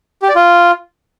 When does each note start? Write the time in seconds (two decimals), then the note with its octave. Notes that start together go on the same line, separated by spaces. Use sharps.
0.22 G4
0.29 D5
0.35 F4